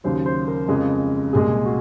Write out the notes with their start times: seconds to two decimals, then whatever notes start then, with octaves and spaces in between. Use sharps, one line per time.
0.04 D#2 C#3 F#3 C5
0.26 C5
0.48 A#4
0.68 F2 C#3 F3 G#3
1.33 C2 A#2 G#3 G#4
1.65 F#4